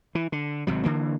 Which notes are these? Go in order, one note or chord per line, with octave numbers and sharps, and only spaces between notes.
E3
D3
G#1 C3 F#3
D3 E3 A#3